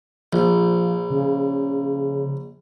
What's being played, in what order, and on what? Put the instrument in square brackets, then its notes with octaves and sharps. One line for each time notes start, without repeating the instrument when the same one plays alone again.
[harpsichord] A#1 [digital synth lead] F3
[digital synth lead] C#3